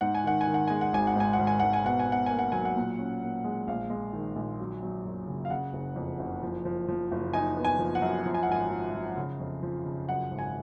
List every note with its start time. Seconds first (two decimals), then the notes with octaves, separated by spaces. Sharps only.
0.01 G#2 F#5
0.15 G#5
0.24 D#3 F#5
0.41 G#5
0.47 D#3
0.54 F#5
0.68 G#3 G#5
0.81 F#5
0.93 G#1 G#5
1.07 F#5
1.16 G#2 G#5
1.33 F#5
1.38 G#1
1.47 G#5
1.60 G#1 F#5
1.73 G#5
1.85 B2 F#5
1.99 G#5
2.07 B2
2.12 F#5
2.26 A#3 G#5
2.39 F#5
2.52 F#3 G#5
2.65 F#5
2.76 A#2
2.99 C#4
3.22 A#2
3.44 G#3
3.67 A#1 F5
3.90 G#3
4.13 D#3
4.36 A#1
4.59 F#3
4.83 F#3
5.05 F#2
5.27 C#3
5.45 F5
5.50 C#3 F#5
5.73 F#1
5.96 F2
6.19 F#1
6.43 F3
6.65 F3
6.88 F3
7.11 F#1
7.33 D#4 G#5
7.57 B3
7.65 G#5
7.79 F3
7.95 F#5
8.02 F#2
8.25 F3
8.34 G#5
8.43 F#5
8.48 G#1 G#5
8.71 F3
8.95 F3
9.17 C#3
9.40 F2
9.63 F3
9.85 C#3
10.09 F#2 F#5
10.31 G#1
10.39 G#5